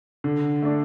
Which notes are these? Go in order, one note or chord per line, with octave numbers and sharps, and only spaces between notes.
D3
A3 D4